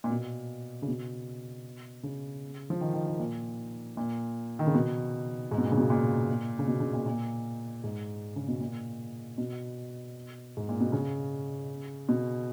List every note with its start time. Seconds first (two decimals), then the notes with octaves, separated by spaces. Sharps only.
0.04 A#2
0.10 B2
0.82 C#3
0.88 B2
2.03 C#3
2.70 F3
2.81 D#3
2.93 D#3
3.07 D#3
3.19 A#2
3.97 A#2
4.59 D#3
4.67 C#3
4.75 B2
5.51 G#2
5.58 B2
5.64 A#2
5.71 C#3
5.78 B2
5.90 A#2
6.59 C#3
6.68 B2
6.80 C#3
6.93 A#2
7.06 A#2
7.84 G#2
8.36 C#3
8.48 B2
8.60 A#2
9.38 B2
10.57 G#2
10.69 A#2
10.80 B2
10.92 C#3
12.09 B2